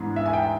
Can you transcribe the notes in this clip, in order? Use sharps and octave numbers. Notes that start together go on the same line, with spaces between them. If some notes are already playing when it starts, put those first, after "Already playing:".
Already playing: G#2 E3 G#3 B3 D4
E5
G#5
G5